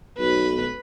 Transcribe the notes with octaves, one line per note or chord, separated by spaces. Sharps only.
B1 B4